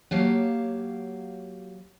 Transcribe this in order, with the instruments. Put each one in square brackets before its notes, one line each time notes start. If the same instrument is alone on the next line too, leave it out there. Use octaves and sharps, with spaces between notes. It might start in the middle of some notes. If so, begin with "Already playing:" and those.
[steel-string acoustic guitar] F#3 A#3 G4 C#5 F5 A5